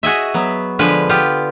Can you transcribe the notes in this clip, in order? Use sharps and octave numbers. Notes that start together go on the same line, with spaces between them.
F#4 G#4 D#5 E5
F#3 B3
D3 F3 G#3 B4
B3 F4 G4